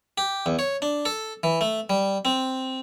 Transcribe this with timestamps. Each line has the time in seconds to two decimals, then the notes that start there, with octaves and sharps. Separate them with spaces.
0.18 G4
0.46 E2
0.59 C#5
0.82 D4
1.05 A4
1.43 E3
1.61 A3
1.90 G3
2.25 C4